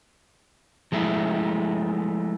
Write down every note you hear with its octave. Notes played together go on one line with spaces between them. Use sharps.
F3 G#3 A3 E4